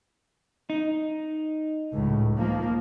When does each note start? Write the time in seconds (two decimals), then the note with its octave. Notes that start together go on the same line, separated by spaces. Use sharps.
0.70 D#4
1.92 C#2 A2
2.37 F3 A#3